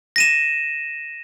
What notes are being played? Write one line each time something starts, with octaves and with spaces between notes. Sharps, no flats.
A#6 D#7 E7